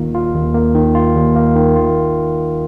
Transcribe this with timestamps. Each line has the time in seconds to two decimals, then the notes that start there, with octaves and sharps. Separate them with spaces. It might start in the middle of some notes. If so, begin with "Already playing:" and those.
Already playing: D#2 D#3 A#3 F4
0.15 F4
0.35 D#2
0.54 A#3
0.75 D#3
0.95 F4
1.15 D#2
1.36 A#3
1.56 D#3
1.75 F4